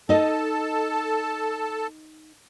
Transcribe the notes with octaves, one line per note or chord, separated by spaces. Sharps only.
D#4 A4 D#5 A5